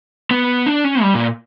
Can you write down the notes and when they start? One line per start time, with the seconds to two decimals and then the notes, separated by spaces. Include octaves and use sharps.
0.31 B3
0.66 D4
0.84 C#4
1.02 G3
1.15 A#2